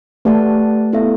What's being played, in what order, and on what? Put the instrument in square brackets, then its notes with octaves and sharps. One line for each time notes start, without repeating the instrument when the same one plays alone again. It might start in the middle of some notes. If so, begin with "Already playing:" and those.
[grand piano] A3 [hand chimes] G4 B4 D5 F#5 A5
[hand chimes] B3 E4 A4 E5